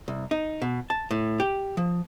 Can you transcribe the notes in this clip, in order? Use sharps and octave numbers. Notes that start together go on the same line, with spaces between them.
C2
D#4
B2
A5
A2
G4
F3